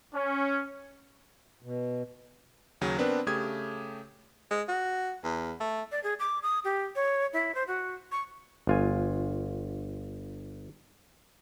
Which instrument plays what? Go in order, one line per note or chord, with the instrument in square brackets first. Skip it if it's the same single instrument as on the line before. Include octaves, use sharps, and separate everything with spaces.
[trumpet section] C#4
[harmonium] B2
[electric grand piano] D#2 C#3 F#3 C#4
B3 C4 D4 A#4 B4
C#3 A3 G4 D#6 G#6
[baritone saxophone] G#3
F#4
E2
A3
[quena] D5
G#4
D6
D#6
G4
C#5
E4
C5
F#4
C#6
[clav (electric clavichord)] G1 F4 G#5